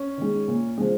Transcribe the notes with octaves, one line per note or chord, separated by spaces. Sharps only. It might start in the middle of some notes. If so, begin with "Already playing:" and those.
Already playing: C#4
D#3 G#3
A#2
F3 G#3